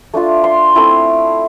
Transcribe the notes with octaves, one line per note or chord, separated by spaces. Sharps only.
A3 D4 F4
C6
A3 C4 E4